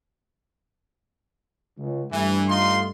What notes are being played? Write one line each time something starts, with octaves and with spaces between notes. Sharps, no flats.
C#2
G2 E3 A3
D#4 F4 C6